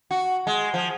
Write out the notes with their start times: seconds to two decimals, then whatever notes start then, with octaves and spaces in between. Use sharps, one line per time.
0.11 F#4
0.47 G#3
0.74 F3